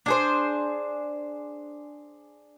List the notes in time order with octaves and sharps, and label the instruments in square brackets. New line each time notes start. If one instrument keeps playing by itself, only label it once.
[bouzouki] D4 G#4 C5